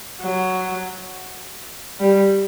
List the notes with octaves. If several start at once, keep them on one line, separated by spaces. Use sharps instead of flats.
F#3
G3